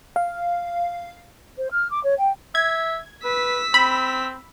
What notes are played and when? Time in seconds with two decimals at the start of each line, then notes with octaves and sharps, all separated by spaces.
0.16 F5
1.57 C5
1.71 F6
1.90 D6
2.04 C#5
2.18 G5
2.55 E5 G#6
3.24 B4 E6 B6
3.74 C4 B5